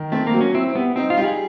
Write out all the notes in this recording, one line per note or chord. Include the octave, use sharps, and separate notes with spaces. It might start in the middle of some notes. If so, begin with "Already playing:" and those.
Already playing: D#3
A3 C4
A#3
F#3
C#4
C4 E4
G3 B3
C4 D#4
F4
G3
G#4